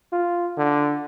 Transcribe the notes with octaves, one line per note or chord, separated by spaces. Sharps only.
F4
D3